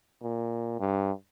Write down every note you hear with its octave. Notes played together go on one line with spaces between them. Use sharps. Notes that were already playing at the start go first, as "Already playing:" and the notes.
A#2
G2